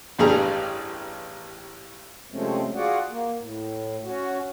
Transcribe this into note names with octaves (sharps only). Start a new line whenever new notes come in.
A1 G2 G3 G#4 A#5
C3 F3 G#3 A3 C4 C#4
F4 F#4 G#4 D5 F#5
A#3
A2
C#4 F#4